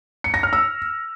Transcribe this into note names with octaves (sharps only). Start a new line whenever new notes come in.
C#7
A#6
F6
E6